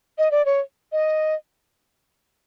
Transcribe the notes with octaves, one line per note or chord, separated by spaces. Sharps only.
D#5
D5
C#5
D#5